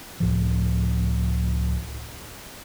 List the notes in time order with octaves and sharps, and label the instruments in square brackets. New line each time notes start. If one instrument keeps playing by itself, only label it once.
[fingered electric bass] C#2 A2 F3